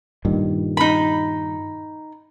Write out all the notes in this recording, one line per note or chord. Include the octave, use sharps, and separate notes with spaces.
G2 A#2 D#3
D#4 B5